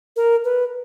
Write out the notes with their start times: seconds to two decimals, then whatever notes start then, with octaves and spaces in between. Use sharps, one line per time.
0.16 A#4
0.44 B4